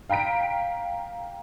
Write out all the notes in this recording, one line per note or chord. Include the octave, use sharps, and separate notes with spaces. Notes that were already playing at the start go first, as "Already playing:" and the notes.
F5 G5 A#5 B6 D7